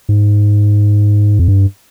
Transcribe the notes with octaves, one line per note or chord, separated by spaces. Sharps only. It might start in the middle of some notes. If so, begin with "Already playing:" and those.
G#2
F2
G2